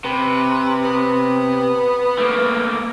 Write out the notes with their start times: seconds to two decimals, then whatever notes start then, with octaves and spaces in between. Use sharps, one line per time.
0.04 C3 B4
0.84 B3
2.18 A3 A#3